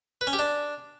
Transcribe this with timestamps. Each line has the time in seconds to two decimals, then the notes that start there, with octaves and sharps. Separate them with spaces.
0.21 B4
0.27 C#4
0.33 G4
0.39 D4